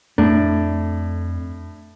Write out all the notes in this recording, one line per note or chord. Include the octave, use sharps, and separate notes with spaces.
F2 A2 D4